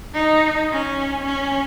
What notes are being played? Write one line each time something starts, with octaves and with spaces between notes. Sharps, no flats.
D#4
C#4
C#4